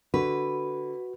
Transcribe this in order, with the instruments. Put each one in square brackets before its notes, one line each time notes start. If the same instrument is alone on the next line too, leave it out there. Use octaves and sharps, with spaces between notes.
[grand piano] D3 [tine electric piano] F#4 [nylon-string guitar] B4